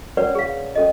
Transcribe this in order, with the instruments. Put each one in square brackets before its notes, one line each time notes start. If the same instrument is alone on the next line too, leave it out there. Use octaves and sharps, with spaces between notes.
[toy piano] C#4 A#4 B4 C#5 D5 F#5
G#4 F5
C#4 A4 D#5